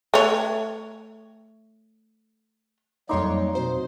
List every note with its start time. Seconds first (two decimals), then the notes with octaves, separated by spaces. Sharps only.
0.14 A3 C#5
3.09 F2 F#3 G3 A#3 D#4 C#5 C6 D6
3.55 F2 B2 C5